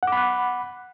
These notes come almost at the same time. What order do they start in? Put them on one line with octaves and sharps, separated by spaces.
F#5 D6 B5 F#6